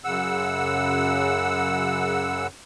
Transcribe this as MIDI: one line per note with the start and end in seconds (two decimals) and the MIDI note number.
0.04 2.47 42
0.04 2.47 49
0.04 2.47 78
0.04 2.47 88